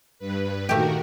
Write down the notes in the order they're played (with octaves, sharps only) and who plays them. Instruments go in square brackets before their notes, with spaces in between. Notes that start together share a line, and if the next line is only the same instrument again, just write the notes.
[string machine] G2 B4
[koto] A#2 A3 G4 [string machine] D#3 F#4 A#4